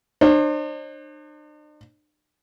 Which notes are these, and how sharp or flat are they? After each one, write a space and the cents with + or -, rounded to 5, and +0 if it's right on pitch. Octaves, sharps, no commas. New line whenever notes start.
D4 +45 C5 +40